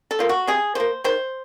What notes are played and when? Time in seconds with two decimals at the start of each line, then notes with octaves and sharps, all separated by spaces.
0.11 A4
0.19 F3 A#3 F4
0.29 F#4
0.47 C3 G#4
0.75 F3 A#3 C5
1.04 D#3 C5